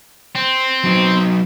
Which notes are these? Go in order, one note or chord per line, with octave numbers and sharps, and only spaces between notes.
C4
F#3 D#4